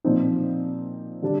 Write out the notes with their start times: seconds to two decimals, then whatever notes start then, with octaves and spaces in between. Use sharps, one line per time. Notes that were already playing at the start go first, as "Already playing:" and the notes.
0.04 A#2 F3 C4 D#4
1.22 D3 G3 D4